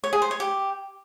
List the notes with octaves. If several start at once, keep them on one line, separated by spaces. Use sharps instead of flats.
C#5
G#4
C5
C#5
G4